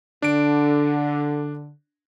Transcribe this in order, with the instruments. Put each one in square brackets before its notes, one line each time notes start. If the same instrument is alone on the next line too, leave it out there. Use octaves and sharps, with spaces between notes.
[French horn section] D3 [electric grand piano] D4 D7